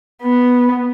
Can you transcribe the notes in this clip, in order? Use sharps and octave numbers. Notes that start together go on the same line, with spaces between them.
B3